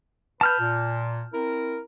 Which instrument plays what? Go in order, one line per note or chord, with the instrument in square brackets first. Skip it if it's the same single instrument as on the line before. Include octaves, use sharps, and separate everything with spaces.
[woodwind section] B4 [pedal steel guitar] A5 F6 G6
[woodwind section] A#2
C4 E4 A#4